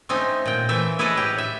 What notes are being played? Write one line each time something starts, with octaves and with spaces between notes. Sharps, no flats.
A3 C4 C#4 D#4
A#2 G5
E3 A3 E5
E4 G#4 A4 B4 C#5 D#5
A2 G4
E5